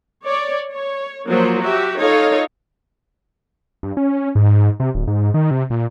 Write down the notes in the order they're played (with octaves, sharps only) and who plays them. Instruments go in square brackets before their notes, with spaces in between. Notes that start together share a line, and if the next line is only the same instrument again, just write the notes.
[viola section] C#5 D5
C#5
F3 F#3 A#3 F4 C5
F#4 G4 E5
D#4 F4 A4 C#5 D#5 F5
[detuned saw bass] G2
C#4
G#2
C3
D1
G#2
D#3
C3
A#2